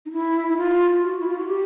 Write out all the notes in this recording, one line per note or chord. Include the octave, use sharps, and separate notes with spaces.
D#4
E4
E4
F4
F#4
E4
F4
F#4
G4